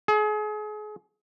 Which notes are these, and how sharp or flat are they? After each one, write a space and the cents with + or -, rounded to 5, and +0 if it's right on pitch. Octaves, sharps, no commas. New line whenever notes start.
G#4 +35